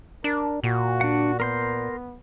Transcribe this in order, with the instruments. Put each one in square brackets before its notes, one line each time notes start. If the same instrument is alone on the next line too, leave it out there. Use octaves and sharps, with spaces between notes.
[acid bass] D4 [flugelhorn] A#4
[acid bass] A#2 [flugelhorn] F#4
[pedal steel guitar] D4 F#5
[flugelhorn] B3 [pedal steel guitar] A#4 C6 G6